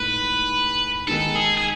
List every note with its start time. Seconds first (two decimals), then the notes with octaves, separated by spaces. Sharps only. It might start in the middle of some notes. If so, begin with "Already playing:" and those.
Already playing: A2 G#3 D#4 B4
1.07 D#3 G#3 D#4 A4
1.35 G#4
1.58 G#4